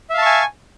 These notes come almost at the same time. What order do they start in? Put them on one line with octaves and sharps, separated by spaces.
E5 F5 A5 C#6 G#5